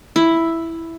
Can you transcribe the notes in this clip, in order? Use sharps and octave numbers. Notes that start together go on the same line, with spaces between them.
E4